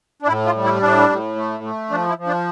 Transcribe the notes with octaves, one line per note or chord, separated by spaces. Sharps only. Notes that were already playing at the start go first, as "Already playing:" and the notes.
D4
A2 E4
F4
G3
E4
A2 D4
A2
A3
A3
F3 D4
E4
F3
D4